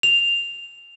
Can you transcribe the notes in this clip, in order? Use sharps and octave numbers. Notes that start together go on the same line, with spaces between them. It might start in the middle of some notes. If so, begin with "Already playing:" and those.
F7